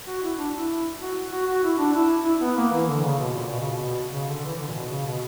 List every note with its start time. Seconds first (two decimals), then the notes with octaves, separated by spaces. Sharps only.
0.07 F#4
0.23 E4
0.38 D4
0.55 E4
1.01 F#4
1.32 F#4
1.47 F#4
1.63 E4
1.78 D4
1.94 E4
2.25 E4
2.41 B3
2.56 A#3
2.72 E3
2.88 D3
3.03 C#3
3.19 B2
3.35 A#2
3.50 B2
3.61 C#3
3.71 B2
4.13 C#3
4.28 D3
4.44 E3
4.58 D3
4.68 A#2
4.74 B2
4.90 C#3
5.06 B2